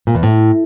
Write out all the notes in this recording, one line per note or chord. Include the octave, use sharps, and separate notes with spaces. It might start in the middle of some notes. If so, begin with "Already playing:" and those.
A#2
E2
A2